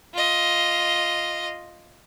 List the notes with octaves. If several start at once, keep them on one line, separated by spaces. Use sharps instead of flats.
F4 D#5